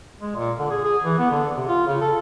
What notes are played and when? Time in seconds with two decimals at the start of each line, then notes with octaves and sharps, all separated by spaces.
0.21 G#3
0.35 A#2
0.59 D3
0.71 G#4
0.84 G#4
1.04 E3
1.19 B3
1.31 D3
1.57 C3
1.68 F4
1.87 C#3
2.01 A4